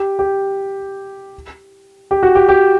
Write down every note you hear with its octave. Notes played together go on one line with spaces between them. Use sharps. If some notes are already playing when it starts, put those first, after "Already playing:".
Already playing: G4
G4
G4
F#4
G4
G4